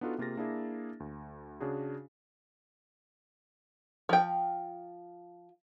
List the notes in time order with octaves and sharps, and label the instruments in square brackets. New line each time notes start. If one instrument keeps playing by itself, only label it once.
[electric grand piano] B3 D4 D#4 F4 F#4 A4
C3 A#3 F4 G#4 A6 A#6
A#3 D4 E4 G#4 E5
D2
C#3 D4 F#4 G#4
[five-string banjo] F3 G5